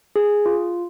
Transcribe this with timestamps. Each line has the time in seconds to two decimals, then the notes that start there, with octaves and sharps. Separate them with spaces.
0.16 G#4
0.46 F4